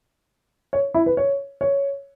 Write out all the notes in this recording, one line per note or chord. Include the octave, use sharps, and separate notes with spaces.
C#5
E4
B4
C#5
C#5